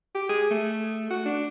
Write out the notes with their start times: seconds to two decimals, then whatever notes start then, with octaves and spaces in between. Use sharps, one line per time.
0.15 G4
0.29 G#4
0.50 A3
1.11 F#4
1.26 D4